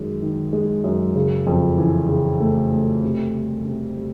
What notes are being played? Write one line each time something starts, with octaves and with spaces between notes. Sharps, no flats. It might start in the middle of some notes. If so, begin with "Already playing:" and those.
Already playing: F#2 D#3 G#3
D#3
G#3
F#2
C#3
F2
E3
C#3
A3
A3
C3
G3
C3
G3